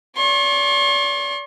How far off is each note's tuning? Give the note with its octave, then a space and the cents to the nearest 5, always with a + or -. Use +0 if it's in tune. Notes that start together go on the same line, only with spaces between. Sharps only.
D5 -40 C6 +45